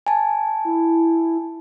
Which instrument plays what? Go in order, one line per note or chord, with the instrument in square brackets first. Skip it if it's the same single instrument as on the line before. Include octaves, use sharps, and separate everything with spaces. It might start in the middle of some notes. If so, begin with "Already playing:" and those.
[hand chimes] G#5 A5
[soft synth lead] E4